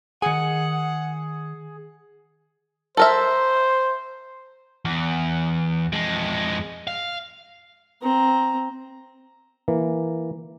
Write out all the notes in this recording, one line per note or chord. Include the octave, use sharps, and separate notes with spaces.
D#3 G#4 F#5 G#5 C#7
A4 A#4 C5 E5
E2
F2 G#3
F5
C4 A#5
E3 A#3